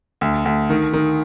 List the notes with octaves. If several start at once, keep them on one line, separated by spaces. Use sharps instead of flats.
D2
D2
D#3
D#3